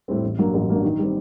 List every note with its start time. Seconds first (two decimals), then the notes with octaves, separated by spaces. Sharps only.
0.08 A2 G3 C4
0.23 A1
0.38 G2 F#3 A#3 D4
0.54 A1
0.69 G2 F#3 A#3 D4
0.84 D#3
0.99 G3 C4